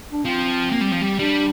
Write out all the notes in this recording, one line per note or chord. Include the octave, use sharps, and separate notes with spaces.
D4
F3 C4
A#3
G3
F3
G3
G3 D4